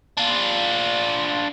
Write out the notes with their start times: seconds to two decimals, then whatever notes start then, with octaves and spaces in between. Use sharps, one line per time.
0.17 D4 F4